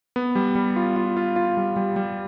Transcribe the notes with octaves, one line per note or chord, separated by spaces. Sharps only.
B3
G3
G3
F4
F4
F4
F4
G3
G3
G3